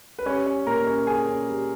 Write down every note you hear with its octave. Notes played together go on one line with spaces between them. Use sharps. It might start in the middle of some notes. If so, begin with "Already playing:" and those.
B4
G3 C#4 C#5
C#4
A#2 A#4 A#5
C#4
C#4 G#4 G#5
C#4
G3